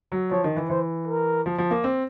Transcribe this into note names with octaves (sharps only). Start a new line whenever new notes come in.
F#3
F3 C#5
D#3
E3
E3 C5
A#4
F3
F3
A#3
C4